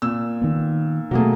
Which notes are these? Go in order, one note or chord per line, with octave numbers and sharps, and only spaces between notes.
A#2 E6
D#3 B3
B2 F#3 A3 A#3 G#4